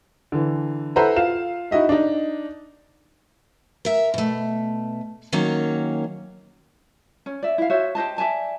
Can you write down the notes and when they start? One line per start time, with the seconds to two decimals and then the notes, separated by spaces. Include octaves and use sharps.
0.32 D3 E3
0.96 E4 A4 B4 C5 F#5 A#5
1.17 F4 F5 E7
1.71 D#4 E4 F#4 D#5 E5
1.89 D4 D#4
3.85 A#4 E5
4.14 B2 A3
5.32 D#3 F#3 A#3 C#4
7.26 C#4
7.43 D5 E5
7.58 E4 F5
7.70 F#4 C5 C#5 E5
7.95 G4 C5 D#5 A5
8.18 D5 E5 G#5 A5